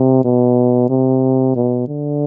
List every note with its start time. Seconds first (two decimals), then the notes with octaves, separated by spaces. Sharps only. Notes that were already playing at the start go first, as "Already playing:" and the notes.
Already playing: C3
0.25 B2
0.90 C3
1.56 B2
1.88 D3